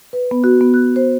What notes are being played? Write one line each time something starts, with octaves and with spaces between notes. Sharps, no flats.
B4
B3
F#4
B3
F#6
C5